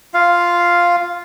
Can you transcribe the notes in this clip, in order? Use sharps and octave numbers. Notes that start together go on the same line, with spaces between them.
F4 F5